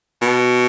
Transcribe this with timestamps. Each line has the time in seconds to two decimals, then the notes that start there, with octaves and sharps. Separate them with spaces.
0.22 B2